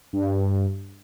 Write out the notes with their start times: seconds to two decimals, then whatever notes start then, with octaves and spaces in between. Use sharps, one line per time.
0.13 G2